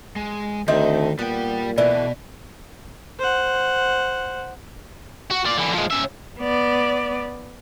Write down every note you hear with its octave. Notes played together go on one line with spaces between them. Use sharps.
G#3
D2 D#3 A3 C4 D#4
A#2 G3 B3 G5
B2 D3 E3 A3 D5
C5 F#5
F#4
F4 D5
D3 E3
F3 G#3
C#3 E5
B3 D5